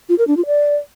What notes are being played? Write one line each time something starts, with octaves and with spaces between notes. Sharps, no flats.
F4
A#4
D4
F4
D5